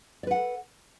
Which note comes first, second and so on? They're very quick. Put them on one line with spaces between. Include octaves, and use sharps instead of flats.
D5 B4 F#5 A4